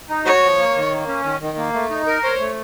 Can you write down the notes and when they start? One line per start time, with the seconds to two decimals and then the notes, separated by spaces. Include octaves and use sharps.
0.09 D#4
0.25 F#4 C#5
0.43 F3
0.58 A#3
0.75 D#3
0.92 A#3
1.08 C#4
1.24 D#3
1.40 D#3
1.57 A#3
1.73 A3
1.90 D#4
2.06 A#4
2.23 C5 C#5
2.39 A3